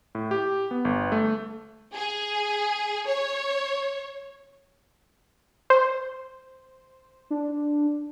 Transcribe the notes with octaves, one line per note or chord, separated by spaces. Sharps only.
A2
G4
B3
G1
A3
G#4
C#5
C5
D4